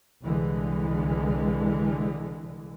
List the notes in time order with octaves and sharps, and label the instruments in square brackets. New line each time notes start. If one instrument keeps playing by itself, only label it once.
[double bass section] C2 D3 E3 G#3